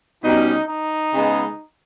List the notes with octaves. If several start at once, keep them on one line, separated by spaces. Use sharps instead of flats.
B2 G3 C#4 D#4
D#4
C#3 G#3 B3